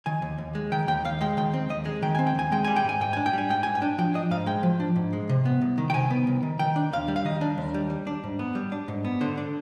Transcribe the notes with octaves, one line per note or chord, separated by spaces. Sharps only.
D#3 G#5
D#2
D#2
G#3
D#3 G5
D#2 G5
D#2 F5
G#3 G5
D#3 G5
C4
D#2 D#5
G#3
D#3 G5
C4 G#5
G5
D#2 G#5
G#3 G5
G3 G#5
G5
G#2 G#5
G#2 G5
D4 G#5
G5
G3 G#5
G#2 G5
G#2 G#5
G5
D4
F3 G5
D4 D#5
G#2 F5
G#3 G5
F3
D4
G#2
G#3
C3
B3
C2
D#3
G5
C3 G#5
B3
C2
D#3
D#3 G5
D4
D#2 F5
G3
F5
D#3 D#5
D4
D#2
G3
G3
D4
G#2
B3
G3
D4
G#2
B3
D3 C5
D4